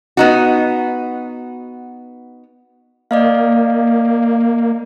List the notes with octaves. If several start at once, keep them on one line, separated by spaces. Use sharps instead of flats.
B3 D#4 F#4
A#3 D5 D#5 F5